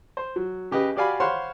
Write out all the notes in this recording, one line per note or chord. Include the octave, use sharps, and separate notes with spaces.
C5
F#3
C#3 G4 B4 D#5
F#4 G4 D5 F5 G#5 B5
C5 C#5 F5 F#5 B5 C6